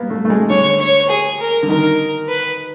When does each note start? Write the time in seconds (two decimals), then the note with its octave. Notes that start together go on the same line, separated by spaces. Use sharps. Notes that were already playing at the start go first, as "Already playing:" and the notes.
Already playing: A#3 B3
0.10 A3
0.25 A3
0.30 G#3
0.50 D3 C#5
0.80 C#5
1.09 G#4
1.40 A#4
1.63 D3
1.69 D#3 A#4
2.29 B4